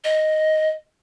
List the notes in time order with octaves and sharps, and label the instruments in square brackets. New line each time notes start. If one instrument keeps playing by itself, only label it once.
[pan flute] D#5